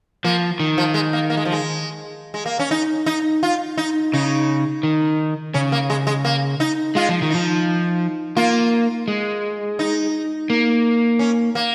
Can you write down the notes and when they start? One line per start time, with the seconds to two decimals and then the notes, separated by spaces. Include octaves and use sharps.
0.24 F3 A#3
0.60 D#3
0.78 F3
0.94 G#3
1.13 A#3
1.30 A#3
1.37 G#3
1.45 F3
1.52 G#3
2.34 G#3
2.46 A#3
2.59 C#4
2.71 D#4
3.06 D#4
3.43 F4
3.77 D#4
4.13 C#3 D#4
4.83 D#3
5.54 C#3 C#4
5.72 A#3
5.90 G#3
6.07 G#3
6.25 A#3
6.60 D#4
6.95 G#3 F4
7.09 F3
7.22 D#3
7.30 F3 D#4
8.36 A#3 F4
9.08 G#3
9.79 D#4
10.50 A#3
11.19 C#4
11.55 A#3